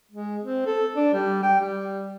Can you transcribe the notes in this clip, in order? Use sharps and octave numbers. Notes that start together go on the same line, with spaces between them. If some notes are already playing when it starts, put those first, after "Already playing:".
G#3
C4
A4
D4
G3
G5
G3